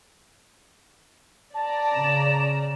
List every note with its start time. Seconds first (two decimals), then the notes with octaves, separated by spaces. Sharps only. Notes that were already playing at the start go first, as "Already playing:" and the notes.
1.54 D5 A5 A#5
1.94 C#3 E7